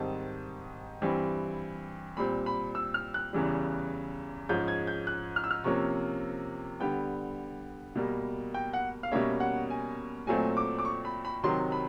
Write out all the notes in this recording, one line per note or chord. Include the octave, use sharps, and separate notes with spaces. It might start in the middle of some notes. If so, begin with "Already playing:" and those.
Already playing: G#2 D#3 G3 C4 A5
G2 E3 G3 C4
A#2 G3 C4 B5
B5
E6
F6
F#6
E2 C#3 E3 G3
G#2 F3 G#3 C#4 G6
G#6
G6
F#6
F6
E6
F6
C3 F3 A#3 C#4 C#6
D3 G3 B3 G5
B2 G3 A#3
G5
F#5
F5
B2 G3 A#3 C#4 E5
F#5
G#5
A#2 F#3 A3 C4 G#5
D6
D6
C#6
B5
B5
C3 D#3 F#3 C6
B5